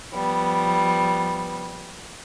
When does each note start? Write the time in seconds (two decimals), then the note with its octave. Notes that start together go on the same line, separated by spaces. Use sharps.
0.12 F3 G3 B3